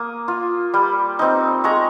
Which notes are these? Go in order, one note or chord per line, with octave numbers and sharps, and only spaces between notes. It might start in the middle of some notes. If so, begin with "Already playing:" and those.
Already playing: A#3 D#6
F4
G3
C4 D#4
G#3 A#5 C#6